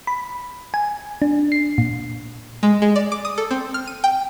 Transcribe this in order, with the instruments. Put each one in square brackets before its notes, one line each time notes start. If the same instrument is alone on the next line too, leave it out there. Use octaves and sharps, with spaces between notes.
[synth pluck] B5
G#5
D4
C7
A#2
G#3
G#3
D5
D6
D#6
A4
C4
F6
D#7
G5